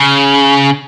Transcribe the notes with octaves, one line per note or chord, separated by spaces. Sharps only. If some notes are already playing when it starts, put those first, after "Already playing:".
Already playing: C#3